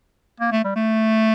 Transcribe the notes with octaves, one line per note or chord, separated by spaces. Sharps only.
A#3
A3
G3
A3